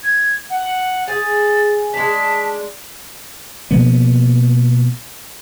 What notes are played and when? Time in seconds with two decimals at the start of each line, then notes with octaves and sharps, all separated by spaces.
0.03 G#6
0.50 F#5
1.08 G#4 A6
1.94 G#3 D4 A5 B6
3.71 B2 F3 A#3 B3